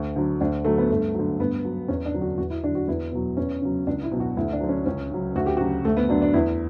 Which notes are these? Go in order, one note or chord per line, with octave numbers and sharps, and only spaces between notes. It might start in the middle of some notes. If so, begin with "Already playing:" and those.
Already playing: D2
D3 F#3
D2 D4
D3 F#3 A3
B3
G2 A3
D3 F#3
G2 B3
F#3
E2 C#4
D4
D3 F#3
F#4
E2 F#4
E4
D3 F#3 D4
F#4
E2 E4
B2 F#3
E2 C#4
C#3 F#3
C#2 D4
E4
B2 F#3
F#4
D2 E4
D4
D3 F#3
C#4
C#2 C#4
C#3 F#3
D2 F#4
G4
F#4
C#3 F#3
D2 A3
B3
D3 F#3 D4
D4
E2 E4